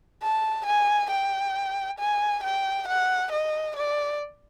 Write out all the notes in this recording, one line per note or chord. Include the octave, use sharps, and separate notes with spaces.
A5
G#5
G5
G#5
G5
F#5
D#5
D5